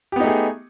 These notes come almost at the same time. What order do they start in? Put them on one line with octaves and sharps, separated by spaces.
G4 B3 D#4 A3 G#4